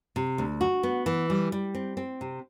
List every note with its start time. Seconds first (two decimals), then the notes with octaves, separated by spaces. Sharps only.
0.16 C3
0.38 D2
0.61 F#4
0.83 B3
1.06 E3
1.30 G3
1.52 G3
1.75 C4
1.97 C4
2.21 C3